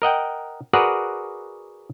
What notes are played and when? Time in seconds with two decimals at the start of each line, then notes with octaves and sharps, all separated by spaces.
0.02 A#4 D#5 F#5 G5
0.73 F#4 G#4 A#4 B4 D5 F#5